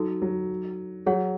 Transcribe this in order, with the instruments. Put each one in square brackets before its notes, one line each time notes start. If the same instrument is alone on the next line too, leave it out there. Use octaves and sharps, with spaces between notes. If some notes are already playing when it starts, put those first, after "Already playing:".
Already playing: [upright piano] F#3 [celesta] D#4 F#4 A4
[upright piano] F#3
[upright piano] F#3 [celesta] G#4 C#5 F#5